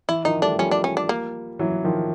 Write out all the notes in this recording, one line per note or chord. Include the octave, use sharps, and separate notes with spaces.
E3 E4
D#3 F3 D#4
G3 A3 D4
F3 G3 C#4
D4
C#4
D4
A#3
E3 F#3
D#3 F3